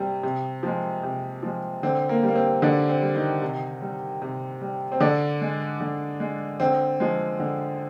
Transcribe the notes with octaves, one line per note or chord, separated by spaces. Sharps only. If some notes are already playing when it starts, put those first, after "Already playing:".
Already playing: C3 G3
C3
F3 G#3
C3
F3 G#3
D3 C4
A#3
G3
A#3
C4
D3 D4
C4
G3
D#3 D#4
C3
G3
C3
G3
C4
D3 D4
G#3
D3
G#3
D3 C4
F3 G#3
D3